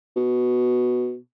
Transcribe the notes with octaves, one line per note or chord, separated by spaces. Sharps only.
B2